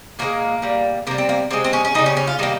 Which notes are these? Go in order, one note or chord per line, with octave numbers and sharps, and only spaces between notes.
A#2 F3 G#3 A#3
A#2 G3
C3 G3 A#3
C4
A#3
C3 D#3 G#3 C4
C4
C#4
C#4
C#3 G3 D#4
C#4
C#4
F4
C3 D#3 G3 A#3